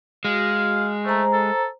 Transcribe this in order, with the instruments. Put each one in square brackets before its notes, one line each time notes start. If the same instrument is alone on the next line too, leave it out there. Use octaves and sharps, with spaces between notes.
[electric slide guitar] G#3 [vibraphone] F#4 [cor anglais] F5
[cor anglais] A3 [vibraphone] C5 A#5
[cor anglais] A4